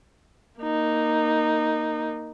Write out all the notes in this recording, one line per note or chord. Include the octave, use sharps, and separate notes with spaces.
A#3 D#4